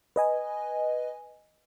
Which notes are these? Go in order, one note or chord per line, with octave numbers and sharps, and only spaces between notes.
B4 D#5 G#5